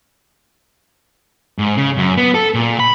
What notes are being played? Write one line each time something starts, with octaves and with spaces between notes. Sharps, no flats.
G#2
C#3
F#2
B3
A4
A#2
B5